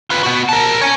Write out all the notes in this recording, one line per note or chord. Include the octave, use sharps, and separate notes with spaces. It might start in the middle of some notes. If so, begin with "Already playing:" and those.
F4 B4
B3 F#4
A#4 A5
C#5 G#5